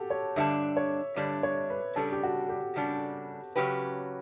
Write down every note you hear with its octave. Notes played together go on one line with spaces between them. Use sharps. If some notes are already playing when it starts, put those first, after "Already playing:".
Already playing: F#4 G4 A4
C#5
G2 D3 G3 D4 E5
C#5
G2 D3 G3 D4 D5
C#5
B4
C#3 G3 D4 A4
G4
F#4
G4
C#3 G3 D4
C#3 F#3 C#4 G4 B4